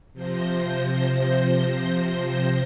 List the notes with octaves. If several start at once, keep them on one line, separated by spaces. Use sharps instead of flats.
C3 F3 C5 G6 A#6